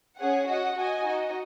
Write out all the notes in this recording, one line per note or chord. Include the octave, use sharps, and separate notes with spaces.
C#4 G#4 C#5 F#5
F#4 D#5 F#5
F#4 D#5 G#5
D#4 F#4 D#5